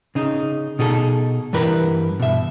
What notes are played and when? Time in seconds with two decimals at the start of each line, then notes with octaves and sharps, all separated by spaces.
0.15 C#3 D#4
0.79 B2 D#4 G#4 A4
1.53 G2 E3 A#4 B4
2.20 B2 E5